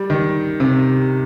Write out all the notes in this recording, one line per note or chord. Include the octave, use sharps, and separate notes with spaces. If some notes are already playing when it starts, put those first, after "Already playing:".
Already playing: G3
D#3
C3